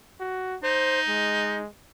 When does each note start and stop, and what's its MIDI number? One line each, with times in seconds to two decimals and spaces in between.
0.20 0.57 66
0.64 1.59 63
0.64 1.00 72
1.08 1.68 56